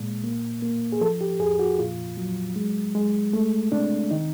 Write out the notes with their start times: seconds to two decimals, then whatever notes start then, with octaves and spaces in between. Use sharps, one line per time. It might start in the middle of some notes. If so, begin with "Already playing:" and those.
Already playing: A#2 G#3
0.24 A#3
0.62 A#3
0.92 G#4
1.01 F3 A4
1.21 G4
1.40 F2 G#4
1.59 F#4
1.79 A#2 F4
2.17 F#3
2.56 G#3
2.95 G#3
3.33 A3
3.72 C3 D4
4.11 D#3 D#4